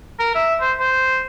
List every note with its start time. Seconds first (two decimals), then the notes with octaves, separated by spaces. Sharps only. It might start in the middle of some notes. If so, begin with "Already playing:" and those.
0.20 A#4
0.35 E5
0.61 C5
0.80 C5